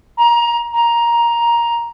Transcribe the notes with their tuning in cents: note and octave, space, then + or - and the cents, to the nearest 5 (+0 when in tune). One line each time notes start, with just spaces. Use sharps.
A#5 +20
A#5 +10